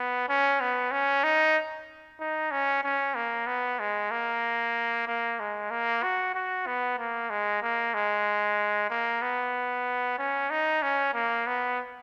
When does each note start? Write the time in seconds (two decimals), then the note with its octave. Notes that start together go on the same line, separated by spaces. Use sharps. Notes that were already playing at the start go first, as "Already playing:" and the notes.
Already playing: B3
0.29 C#4
0.61 B3
0.92 C#4
1.24 D#4
2.20 D#4
2.51 C#4
2.83 C#4
3.15 A#3
3.47 B3
3.80 G#3
4.11 A#3
5.08 A#3
5.40 G#3
5.71 A#3
6.04 F#4
6.35 F#4
6.67 B3
6.98 A#3
7.30 G#3
7.63 A#3
7.94 G#3
8.90 A#3
9.22 B3
10.18 C#4
10.51 D#4
10.82 C#4
11.14 A#3
11.47 B3